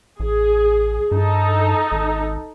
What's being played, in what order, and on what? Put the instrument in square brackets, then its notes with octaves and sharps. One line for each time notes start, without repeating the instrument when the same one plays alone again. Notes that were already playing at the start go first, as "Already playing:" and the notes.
[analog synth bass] A1 [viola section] G#4
[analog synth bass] G2 [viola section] D#4 A4
[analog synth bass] G#1